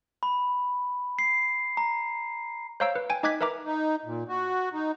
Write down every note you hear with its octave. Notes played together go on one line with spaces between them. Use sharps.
B5
C7
A#5
C5 C#5 F5 A#5 E6 D7
B4
G5 G#5
D#4 D#5 D6 F#6 G#6 B6
A#4 B4 E5 A#5 D6
D#4
A#2
F#4
D#4